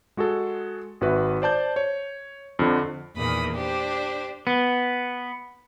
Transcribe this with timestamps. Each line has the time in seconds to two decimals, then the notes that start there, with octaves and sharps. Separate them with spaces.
0.17 G#3 F#4 G#4 A4
1.01 G#1 F#4 B4 E5
1.42 C5 D5 A5 G6
1.76 C#5
2.59 F2 D3
3.15 E2 A#2 D#3 B5 D#6
3.53 D4 G4 C5
4.47 B3